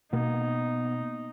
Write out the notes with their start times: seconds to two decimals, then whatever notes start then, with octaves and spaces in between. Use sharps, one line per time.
0.13 B2 A#3 B3 D#4